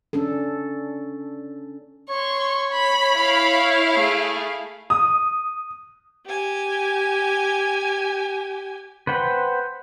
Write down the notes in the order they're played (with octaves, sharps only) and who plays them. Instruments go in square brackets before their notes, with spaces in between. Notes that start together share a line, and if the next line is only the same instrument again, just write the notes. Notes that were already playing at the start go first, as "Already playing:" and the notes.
[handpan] C#4 D4 A4
[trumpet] C#5 [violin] C6 C#6
[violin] B5
[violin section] E4 F5
[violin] A3 G#4
[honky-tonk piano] D#6
[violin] G4 G#5
[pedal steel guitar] B4 C5 F#5 G5